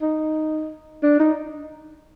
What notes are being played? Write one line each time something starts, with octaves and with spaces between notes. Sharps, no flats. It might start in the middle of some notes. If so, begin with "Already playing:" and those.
D#4
D4
D#4